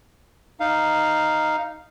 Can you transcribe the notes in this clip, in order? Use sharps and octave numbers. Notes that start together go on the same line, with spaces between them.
D#4 F5